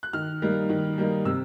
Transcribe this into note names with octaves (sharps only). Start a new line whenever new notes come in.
F#6
D#3 F6
G3 A#3 D#4
D#3
G3 A#3 D#4
C3 E6